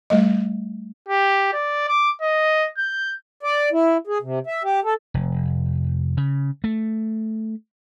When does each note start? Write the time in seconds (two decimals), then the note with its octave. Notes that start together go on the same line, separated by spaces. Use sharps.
0.10 G3 A3 D#5
1.09 G4
1.53 D5
1.88 D6
2.22 D#5
2.78 G6
3.43 D5
3.72 E4
4.07 G#4
4.22 C3
4.47 E5
4.64 G4
4.84 A4
5.14 F1
6.17 C#3
6.64 A3